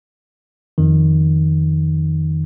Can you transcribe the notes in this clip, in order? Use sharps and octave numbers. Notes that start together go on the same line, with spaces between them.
F2 D#3